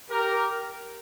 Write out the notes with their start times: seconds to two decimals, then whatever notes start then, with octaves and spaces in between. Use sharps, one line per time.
0.10 G4 A#4